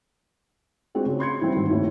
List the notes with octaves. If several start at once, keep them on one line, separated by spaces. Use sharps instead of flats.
G#3 C4 D4 F4 F#4
C#3
B5 C6 G#6 C#7
E3 G3 C4
G#1 D#3 F#4
F#1 D#2 A2